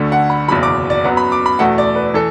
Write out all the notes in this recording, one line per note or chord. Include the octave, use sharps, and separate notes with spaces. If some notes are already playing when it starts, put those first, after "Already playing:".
Already playing: D2 D3 A3
F#5
B5
F#1 E2 B2 F#3 B5
D6
D5
F#2 F#3 B3 F#5
B5
D6
B5
E2 B2 A3 F#5
D5
B4
E3 A4